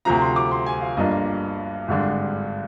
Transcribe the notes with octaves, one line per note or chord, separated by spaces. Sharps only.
D2 C3 F3 A#5
C6
D6
C6
G#5
F5
G1 G2 F3 A#3 D4 D#5
G#1 G2 D3 G#3 D4